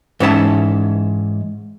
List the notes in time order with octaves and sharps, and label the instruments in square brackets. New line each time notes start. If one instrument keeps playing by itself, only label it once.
[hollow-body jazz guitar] G#2 E3 C#4 C5 E5 A5